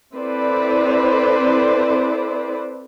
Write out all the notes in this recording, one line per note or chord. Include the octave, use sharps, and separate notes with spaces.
C4 E4 A4 B4 C5 D5